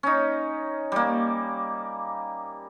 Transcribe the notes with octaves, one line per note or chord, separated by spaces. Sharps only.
C#4 D#4
G3 A#3